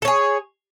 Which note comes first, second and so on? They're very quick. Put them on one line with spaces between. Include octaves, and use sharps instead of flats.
A4 C#5 G#4